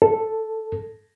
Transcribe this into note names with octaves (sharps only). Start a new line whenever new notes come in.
A4